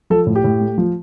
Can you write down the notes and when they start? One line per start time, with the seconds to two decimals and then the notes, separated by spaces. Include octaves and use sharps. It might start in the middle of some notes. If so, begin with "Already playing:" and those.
0.10 F3 A4
0.26 A2
0.36 G4
0.44 A2
0.61 A3
0.78 F3